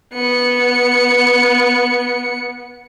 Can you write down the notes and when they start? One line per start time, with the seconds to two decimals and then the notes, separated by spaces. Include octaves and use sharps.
0.13 B3 C#7